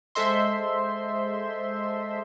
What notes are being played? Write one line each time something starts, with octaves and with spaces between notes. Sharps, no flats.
G#3 A4 C5 D#5 E5 C6